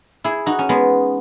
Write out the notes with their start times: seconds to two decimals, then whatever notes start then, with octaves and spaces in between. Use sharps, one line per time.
0.24 E4 G#4
0.46 D#4 F#4
0.59 C#4
0.69 G#3 B3